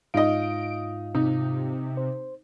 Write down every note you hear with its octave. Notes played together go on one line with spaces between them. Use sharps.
G#2 D#4 F4 D#5 F5 D7
C3 D#4
C5